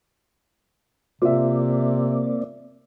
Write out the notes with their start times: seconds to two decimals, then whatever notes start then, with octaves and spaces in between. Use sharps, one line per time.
1.22 C3 A#3 C4 F4 D5 E5